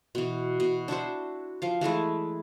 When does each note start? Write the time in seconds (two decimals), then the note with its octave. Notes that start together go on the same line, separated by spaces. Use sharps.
0.15 B2 E3
0.60 B2
0.88 D4 E4 F#4 C5
1.62 F3 F5
1.81 E3 G#3 A3 E4